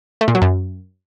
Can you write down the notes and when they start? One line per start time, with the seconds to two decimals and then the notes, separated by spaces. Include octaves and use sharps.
0.21 A3
0.28 A#2
0.35 F#3
0.42 F#2